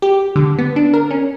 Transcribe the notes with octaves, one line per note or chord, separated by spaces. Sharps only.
G4
D3
B3
D4
A#4
C#4